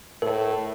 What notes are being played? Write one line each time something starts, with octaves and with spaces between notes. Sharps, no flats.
A2 A#4